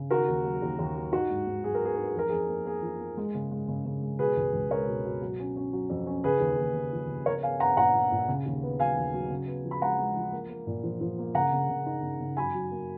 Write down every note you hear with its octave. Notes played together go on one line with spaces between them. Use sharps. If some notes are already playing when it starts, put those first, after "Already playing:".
Already playing: C#3
D#3 F#4 A#4
D#2
F#3
D#2
D#2
F#3
D#4 F#4
G#2
G#2
F#3 G#4
A#4
B3 G#4
D#4 A#4
G#4
F2 A#4
F2 G#4
A#3
A#3 G#4
F3
A#3
G#3
C#3
G#3
C#3
C#3
G#3
B2 G#4 B4
C#2
C#2
G#3 A#4 C#5
B2
B2
F#3
C#4
C#4
F#3
F2
C#4
C#3 G#4 B4
D#2
D#2
C#3
F3
C#3
B3 A#4 C#5
B3 F5 G#5
B3 F#5 A#5
A#2 F#5 A#5
A#2
A#2
C#3
D#2
B3
F#3 F5 G#5
D#2
F#3
C#3
B3
F3
B5
G#3 F#5 A#5
G#3
F3
A#3
A#3
A#2
F3
F3
A#3
C#3 F#5 A#5
C#3
C#3
D#4
C#3
C#3
F#2 G#5 B5
F#3
A#3